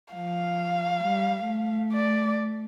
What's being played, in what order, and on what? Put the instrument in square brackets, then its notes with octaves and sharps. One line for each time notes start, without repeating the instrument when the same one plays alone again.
[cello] F3 [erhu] F5
[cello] G3
A3
[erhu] D5